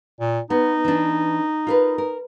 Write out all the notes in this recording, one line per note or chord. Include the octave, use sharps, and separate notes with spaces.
A#2
B3 D#4
E3 D4
F4 A#4 B4
A#4